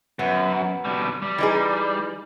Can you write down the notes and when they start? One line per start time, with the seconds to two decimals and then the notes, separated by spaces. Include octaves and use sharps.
0.19 F#2 B3
0.85 B2 G3
1.22 G3
1.38 E3 D#4 G#4